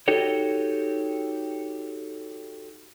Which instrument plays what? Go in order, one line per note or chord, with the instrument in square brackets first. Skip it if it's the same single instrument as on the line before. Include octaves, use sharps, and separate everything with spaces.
[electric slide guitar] D#4 F#4 G4 A4 C#5